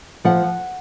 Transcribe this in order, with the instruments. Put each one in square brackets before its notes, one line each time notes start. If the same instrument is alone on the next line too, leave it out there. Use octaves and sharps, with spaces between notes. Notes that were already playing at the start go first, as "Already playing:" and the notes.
[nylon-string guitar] F3 F#5